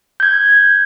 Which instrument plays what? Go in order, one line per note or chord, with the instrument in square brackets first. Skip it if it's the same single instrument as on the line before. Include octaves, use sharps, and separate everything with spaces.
[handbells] G6 G#6